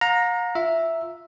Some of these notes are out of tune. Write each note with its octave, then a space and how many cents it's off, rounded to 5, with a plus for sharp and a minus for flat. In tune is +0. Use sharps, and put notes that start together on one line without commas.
F5 +45 A#5 +0
F4 +0 E5 +0